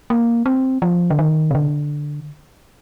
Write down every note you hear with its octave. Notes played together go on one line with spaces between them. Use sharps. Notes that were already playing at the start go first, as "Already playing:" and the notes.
A#3
C4
F3
D3
D#3
C3
D3